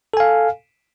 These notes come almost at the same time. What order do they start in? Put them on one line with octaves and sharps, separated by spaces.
A4 G#5 F5